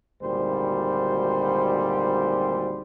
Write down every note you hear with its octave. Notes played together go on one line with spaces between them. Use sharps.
G#1 D2 A#2 G3 C5